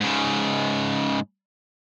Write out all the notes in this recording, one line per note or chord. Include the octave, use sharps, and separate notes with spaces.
G#2 C#3